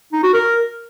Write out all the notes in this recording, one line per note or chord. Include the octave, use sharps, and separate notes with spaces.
D#4
F#4
A#4